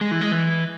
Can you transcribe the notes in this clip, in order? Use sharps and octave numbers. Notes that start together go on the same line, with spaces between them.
G#3
E3
G#3
E3